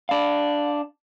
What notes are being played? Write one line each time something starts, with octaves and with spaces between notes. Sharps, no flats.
D4 F5